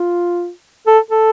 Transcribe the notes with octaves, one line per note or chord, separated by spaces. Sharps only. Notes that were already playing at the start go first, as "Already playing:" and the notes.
Already playing: F4
A4
A4